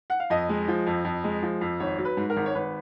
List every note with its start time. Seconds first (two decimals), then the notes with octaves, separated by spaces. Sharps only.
0.10 F#5
0.20 F5
0.30 F2 D#5
0.49 G#3
0.68 F3
0.87 F2
1.05 F2
1.24 G#3
1.43 F3
1.61 F2
1.80 G#1 C#5
1.98 F#3
2.05 B4
2.17 G#2
2.30 A#4
2.36 G#1
2.46 C#5
2.55 G#1 B4